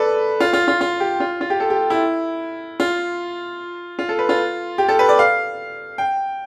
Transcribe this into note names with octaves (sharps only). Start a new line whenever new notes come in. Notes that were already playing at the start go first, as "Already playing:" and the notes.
Already playing: A4 B4 D5
F4
F4
F4
F4
G4
F4
F4
G4
A4
G4
E4
F4
F4
A4
B4
F4
G4
A4
B4
D5
F5
G5